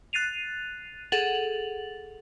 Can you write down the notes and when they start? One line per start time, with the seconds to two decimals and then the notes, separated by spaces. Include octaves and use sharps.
0.13 F#6 A6 C7 D#7 F7
1.12 G#4 A4 F#5 A6 F7 F#7